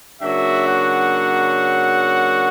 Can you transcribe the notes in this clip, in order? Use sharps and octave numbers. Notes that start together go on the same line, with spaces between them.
C#3 F#3 A#3 D4 F#4 E5
F#5